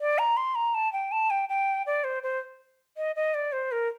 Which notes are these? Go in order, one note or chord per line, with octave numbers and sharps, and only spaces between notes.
D5
A#5
C6
A#5
A5
G5
A5
G5
G5
D5
C5
C5
D#5
D#5
D5
C5
A#4